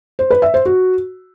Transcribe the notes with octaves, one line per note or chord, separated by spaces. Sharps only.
C5
B4
E5
C5
F#4